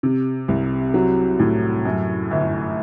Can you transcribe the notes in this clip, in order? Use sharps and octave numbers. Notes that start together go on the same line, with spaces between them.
C3
C2
F#3
A2
F#2
G1